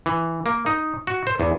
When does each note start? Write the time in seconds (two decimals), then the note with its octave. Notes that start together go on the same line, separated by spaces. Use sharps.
0.06 E3
0.46 A#3
0.66 D#4
1.07 F#4
1.27 C5
1.40 E2